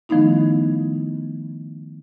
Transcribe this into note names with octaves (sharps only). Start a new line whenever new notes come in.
D#3 F3 A3 B3 D#4 E4